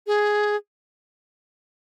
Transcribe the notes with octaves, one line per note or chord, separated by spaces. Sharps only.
G#4